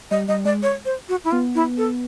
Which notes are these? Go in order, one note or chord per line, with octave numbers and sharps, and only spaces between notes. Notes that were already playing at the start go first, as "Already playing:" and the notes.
G3 D#5
G3 D#5
G#3 D5
C#5
C5
F#4
E4
B3 F4
E4
A4